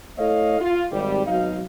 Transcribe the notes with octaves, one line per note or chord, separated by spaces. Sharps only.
A3 E4 A4 C#5 D#5 F5
F4
G#1 G3
G#1 B2 F#3 D#4 F5